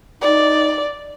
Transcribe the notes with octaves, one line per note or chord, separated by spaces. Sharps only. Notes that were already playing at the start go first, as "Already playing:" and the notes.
D#4 D5